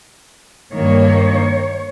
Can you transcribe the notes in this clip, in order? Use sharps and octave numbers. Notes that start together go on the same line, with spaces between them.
G2 D#3 A#3 C#5